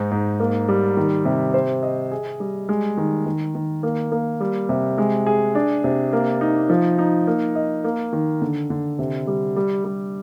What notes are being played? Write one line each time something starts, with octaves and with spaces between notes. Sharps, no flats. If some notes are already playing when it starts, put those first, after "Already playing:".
Already playing: G#2 D#4
G#2
A#3
G3
D#3
C3
C5
D#5
G#4
G3
G#3
D#3
D#3
D#3
A#3
A#3
G3
C3
G#3
G#4
D4
C3
A#3
D#4
F3
D#4
A#3
D#5
A#3
D#3
D3
D3
C3
G3
G3
G3